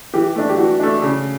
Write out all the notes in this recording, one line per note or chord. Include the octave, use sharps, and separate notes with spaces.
E3 G4
A3 D4
G4
E3 F#4
A3 D4
C#3